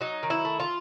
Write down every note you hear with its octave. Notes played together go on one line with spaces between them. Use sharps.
F#3 D#4
D#3
E4
A3
F4